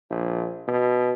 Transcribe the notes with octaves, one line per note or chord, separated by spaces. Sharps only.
A#1
B2